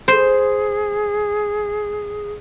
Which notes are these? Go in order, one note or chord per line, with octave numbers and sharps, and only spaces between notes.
G#4 C5